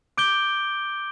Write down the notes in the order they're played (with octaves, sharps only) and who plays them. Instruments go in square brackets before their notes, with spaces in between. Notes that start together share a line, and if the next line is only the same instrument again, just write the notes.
[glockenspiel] D6 G6 D7 G7